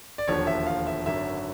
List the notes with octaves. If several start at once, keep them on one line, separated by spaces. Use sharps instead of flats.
D5
E1 D#2 D3 F3 C#5
E5
F5
E5
G#1 F#2 D3 E5